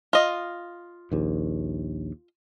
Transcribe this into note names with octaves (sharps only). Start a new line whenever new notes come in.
F4 D#5
A#1 D#2